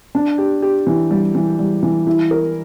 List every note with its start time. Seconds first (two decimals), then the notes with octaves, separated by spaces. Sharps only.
0.15 D4
0.38 G4
0.62 G4
0.87 E3
1.11 G3
1.35 E3
1.59 G3
1.83 E3
2.07 E4
2.31 A#4